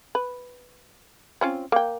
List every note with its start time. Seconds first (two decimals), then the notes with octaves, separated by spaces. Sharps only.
0.15 B4
1.41 C4 C#4 F4
1.72 A#3 G5